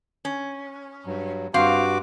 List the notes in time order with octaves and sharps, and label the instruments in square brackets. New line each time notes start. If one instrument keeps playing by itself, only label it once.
[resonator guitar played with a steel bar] C#4
[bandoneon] G2 F#3
[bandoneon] G2 F#4 D6 [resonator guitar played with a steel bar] C4 F5